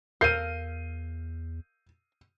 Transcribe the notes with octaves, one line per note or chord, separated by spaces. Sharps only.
E2 A4 A#4 F5 G6 C7 D#7